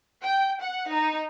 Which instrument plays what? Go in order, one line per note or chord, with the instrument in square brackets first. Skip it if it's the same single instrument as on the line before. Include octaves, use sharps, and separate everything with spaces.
[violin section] G5
F#5
D#4